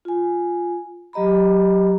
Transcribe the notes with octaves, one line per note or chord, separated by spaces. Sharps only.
F4 G#5
F#3 G4 D#5 A#5 B5